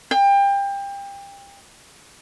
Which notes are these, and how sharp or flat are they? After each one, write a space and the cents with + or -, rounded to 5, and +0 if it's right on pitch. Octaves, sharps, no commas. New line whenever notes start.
G5 +25